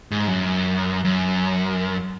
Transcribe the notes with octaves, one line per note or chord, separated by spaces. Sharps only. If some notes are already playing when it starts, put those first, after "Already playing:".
G#2
F#2
F#2